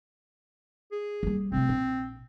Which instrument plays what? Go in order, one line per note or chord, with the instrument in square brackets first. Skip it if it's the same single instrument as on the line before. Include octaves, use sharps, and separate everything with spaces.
[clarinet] G#4
[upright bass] G3 A#3
[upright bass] C3 A3 [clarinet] C4
[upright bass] A#1